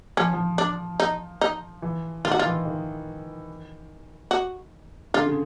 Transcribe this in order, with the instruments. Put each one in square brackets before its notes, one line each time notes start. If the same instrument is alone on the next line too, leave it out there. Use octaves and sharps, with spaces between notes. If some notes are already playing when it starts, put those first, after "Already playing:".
[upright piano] F3 [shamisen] C#4
[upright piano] F3
[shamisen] D4
D#4
D#4
[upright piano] E3
[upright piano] D#3 [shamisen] F4
[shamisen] F#4
F4
[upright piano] E3
D#3
[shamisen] F#4
[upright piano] D3 [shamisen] F4
[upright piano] C#3